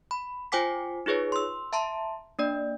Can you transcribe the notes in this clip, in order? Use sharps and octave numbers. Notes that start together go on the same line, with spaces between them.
B5
F4 C5 G5 G#5 D6 B6
D#4 F4 G#4 B4 C#5
C6 E6
E5 A5 A#5 C6
A#3 D4 D5